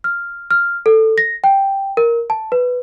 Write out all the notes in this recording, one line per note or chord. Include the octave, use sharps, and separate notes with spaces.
F6
F6
A4
A#6
G5
A#4
A5
B4